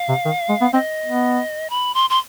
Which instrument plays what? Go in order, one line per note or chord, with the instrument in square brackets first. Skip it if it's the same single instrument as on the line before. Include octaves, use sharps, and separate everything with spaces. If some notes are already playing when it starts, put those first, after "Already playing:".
Already playing: [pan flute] F5
[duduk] C3
D#3
G#3
B3
[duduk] C4 [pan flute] D#5
[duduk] B3
[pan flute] B5
C6
C6